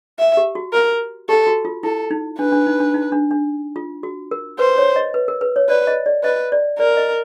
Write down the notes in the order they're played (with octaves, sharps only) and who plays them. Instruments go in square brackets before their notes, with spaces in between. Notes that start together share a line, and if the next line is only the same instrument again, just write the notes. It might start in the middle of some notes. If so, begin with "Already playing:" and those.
[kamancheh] E5
[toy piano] G4
F#4
[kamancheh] A#4
[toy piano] G4 [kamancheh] A4
[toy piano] F#4
F4
[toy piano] E4 [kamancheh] A4
[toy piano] D#4
[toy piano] D4 [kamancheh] B4
[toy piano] D4
D#4
D4
D#4
D4
D4
F4
F#4
A#4
[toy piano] B4 [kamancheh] C5
[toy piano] C#5
D#5
B4
A#4
B4
C#5
[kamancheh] B4 [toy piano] D5
[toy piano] D#5
D5
[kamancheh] B4 [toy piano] D#5
[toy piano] D5
[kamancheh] A#4 [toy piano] D5
[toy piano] D#5